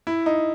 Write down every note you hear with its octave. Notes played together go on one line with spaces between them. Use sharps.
E4
D#4